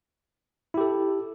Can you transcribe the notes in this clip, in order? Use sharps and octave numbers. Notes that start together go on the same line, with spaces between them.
E4 G4 A4